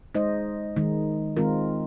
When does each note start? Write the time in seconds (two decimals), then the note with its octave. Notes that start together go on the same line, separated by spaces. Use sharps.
0.15 G#3 D#4 C5 D#5
0.76 D#3 G#3 D#4
1.37 D#3 G#3 C4 F4 A#4